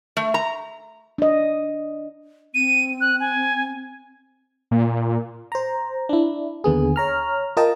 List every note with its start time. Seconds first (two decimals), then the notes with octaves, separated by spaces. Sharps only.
0.17 A3
0.34 A#5
1.18 D4 D#5
2.55 C4 D#7
3.01 F#6
3.20 G#5
4.71 A#2
5.52 C5 A#5
6.09 D4 E4
6.64 D#2 D3 B3 G#4
6.96 C#5 A#5 F6
7.57 F4 A#4 D#5 G5 A5